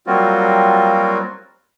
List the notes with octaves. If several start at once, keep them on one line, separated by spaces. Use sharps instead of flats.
F#3 G3 A#3 C4 F4 F#4